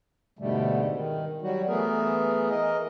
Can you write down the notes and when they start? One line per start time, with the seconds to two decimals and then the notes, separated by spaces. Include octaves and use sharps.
0.39 G#2 B2 D3 G3 A3
0.92 D#3
1.42 F#3 G3 F#4
1.68 E3 A3 B3 G#4 A#4
2.50 E3 A#4 D#5